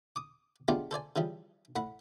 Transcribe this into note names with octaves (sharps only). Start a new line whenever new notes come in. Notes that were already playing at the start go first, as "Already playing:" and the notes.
D6 D#6
G#3 A3 B3 D4 F4 G4
A4 C5 D5 G#5
C#3 E3 F3 G3
A2 F#5 B5